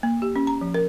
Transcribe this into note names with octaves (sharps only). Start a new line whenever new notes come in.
A#3
G4
C#4
A#5
F3
A#4